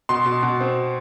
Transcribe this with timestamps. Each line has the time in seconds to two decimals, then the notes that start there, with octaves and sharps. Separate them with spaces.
0.09 B2 C6
0.25 B2
0.43 B2
0.60 C4